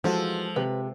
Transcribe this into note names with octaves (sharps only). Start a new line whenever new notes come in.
E3 F3 G#3 F#4 A4
C3 B4